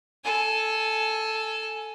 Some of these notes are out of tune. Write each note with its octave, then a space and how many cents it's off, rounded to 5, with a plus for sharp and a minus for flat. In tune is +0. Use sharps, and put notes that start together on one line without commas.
A4 +0 G#5 +15